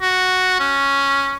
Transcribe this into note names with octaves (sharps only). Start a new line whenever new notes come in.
F#4
C#4